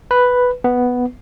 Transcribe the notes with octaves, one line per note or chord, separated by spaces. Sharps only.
B4
B3